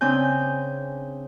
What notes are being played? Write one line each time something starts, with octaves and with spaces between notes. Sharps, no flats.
C#3 C4 D4 G#5 G6